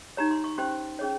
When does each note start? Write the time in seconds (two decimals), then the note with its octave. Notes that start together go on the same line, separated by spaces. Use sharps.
0.17 D#4 G4 C#5 A#5
0.31 C6
0.44 C#6
0.58 C#4 G4 C5 C6
0.99 C#4 G#4 C#5